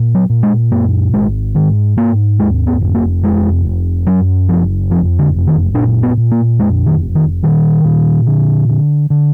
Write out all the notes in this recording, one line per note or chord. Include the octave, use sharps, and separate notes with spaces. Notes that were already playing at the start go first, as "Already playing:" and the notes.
Already playing: A#2
F#3
A#2
G#3
F#2 A#3
G#1 G#3
G#2 D#3
G#2 A#3
D#2 G#3
B3
F1
A#3
F2 G#3
F1
F#2 F#3
F#1 F3
F2 F3
D3
F#1
D#3
A#2 D4
B3
A#2
A#3
F2 G#3
D#3
F1
D#3
A#2 D#3
A#2
D3
D3
D3